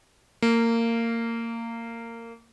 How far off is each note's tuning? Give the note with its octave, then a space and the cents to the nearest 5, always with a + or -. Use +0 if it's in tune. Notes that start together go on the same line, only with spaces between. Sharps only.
A#3 -20